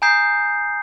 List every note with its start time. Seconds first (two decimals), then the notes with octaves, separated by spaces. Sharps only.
0.02 G#5 A#5 D#6 G6 C7